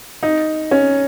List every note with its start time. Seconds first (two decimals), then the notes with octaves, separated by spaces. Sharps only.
0.23 D#4
0.71 C#4